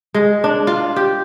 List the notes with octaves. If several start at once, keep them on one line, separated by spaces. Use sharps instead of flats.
G#3
D4
F4
G4